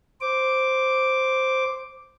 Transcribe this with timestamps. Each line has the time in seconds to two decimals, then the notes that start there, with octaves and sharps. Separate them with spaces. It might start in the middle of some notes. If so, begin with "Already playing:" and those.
0.21 C5 D6